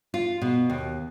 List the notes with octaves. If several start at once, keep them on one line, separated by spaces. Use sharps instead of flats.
F4
B2
D#2